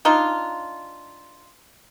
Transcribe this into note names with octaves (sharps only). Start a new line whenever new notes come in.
D4 D#4 F4